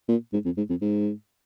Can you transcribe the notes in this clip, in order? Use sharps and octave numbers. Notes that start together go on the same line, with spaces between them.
A#2
G#2
F2
G#2
F2
G#2